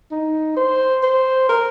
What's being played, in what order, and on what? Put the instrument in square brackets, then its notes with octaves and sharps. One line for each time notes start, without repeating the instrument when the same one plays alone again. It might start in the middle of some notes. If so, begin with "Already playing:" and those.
[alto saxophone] D#4
C5
C5
A#4